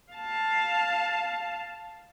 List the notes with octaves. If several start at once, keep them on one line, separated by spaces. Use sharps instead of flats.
F5 A5